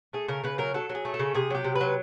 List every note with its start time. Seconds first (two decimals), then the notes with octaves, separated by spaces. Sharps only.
0.13 A3 G#4
0.28 C#3 A#4
0.43 C#3 B4
0.58 F#3 A#4
0.74 F#3 A4
0.89 F#3
0.95 G#4
1.05 A3
1.14 A4
1.19 C#3
1.35 C3 G#4
1.50 F#3 G4
1.64 C3
1.75 B4
1.81 F#3